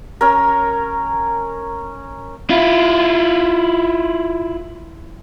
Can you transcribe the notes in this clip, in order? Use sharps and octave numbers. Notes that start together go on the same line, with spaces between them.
C#4 A#4
E4 F4